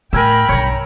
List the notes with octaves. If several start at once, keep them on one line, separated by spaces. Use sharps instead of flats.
A2 A#4 G5 G#5 B5 E6
B1 G2 C#5 A#5